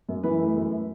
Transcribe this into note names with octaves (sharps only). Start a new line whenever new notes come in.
F#2
E3 B4
A3
F#2